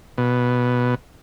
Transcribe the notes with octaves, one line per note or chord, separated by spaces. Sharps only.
B2